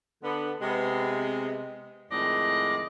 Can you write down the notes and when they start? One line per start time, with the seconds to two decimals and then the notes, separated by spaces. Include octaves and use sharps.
0.23 D3 B3
0.61 C3 G#3 B3
2.11 F2 A2 D#3 G#3 D5 D#5